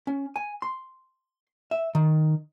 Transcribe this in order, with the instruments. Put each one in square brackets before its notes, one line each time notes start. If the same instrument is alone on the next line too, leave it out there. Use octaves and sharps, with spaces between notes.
[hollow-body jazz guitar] C#4
G#5
C6
E5
D#3